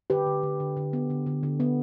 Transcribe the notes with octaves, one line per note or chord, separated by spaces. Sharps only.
D3 G4 B4
D3
D3
D3
D3
B3
D3
D3
D3
B3